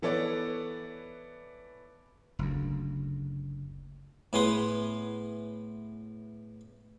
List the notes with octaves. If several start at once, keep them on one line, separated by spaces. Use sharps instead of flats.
E3 B3 A4 C#5 D5
F#1 D2
A2 B3 G#4 B4 C6 D#6